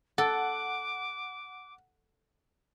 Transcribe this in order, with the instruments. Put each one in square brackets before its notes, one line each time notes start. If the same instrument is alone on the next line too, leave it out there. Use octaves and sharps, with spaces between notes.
[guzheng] A4 [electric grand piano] F#5 [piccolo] D6